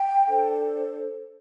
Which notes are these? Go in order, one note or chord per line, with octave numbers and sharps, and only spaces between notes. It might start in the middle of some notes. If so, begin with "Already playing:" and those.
Already playing: G5
D4 A4 C5